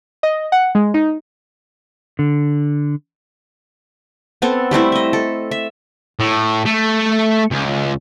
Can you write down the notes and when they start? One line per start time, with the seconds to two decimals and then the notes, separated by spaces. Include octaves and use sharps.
0.23 D#5
0.52 F#5
0.75 G#3
0.94 D#4
2.19 D3
4.42 B3 C4 A4
4.71 G3 A3 C4 E4
4.92 D#5 E5
5.13 A4
5.51 E5
6.20 A2
6.66 A3
7.51 C#2